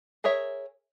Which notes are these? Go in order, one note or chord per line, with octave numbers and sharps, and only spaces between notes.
G#4 A#4 C#5 E5